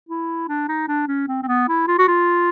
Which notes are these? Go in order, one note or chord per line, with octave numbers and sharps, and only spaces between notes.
E4
D4
D#4
D4
C#4
C4
C4
B3
E4
F4
F#4
F4